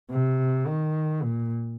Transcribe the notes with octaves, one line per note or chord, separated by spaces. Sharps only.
C3
D#3
A#2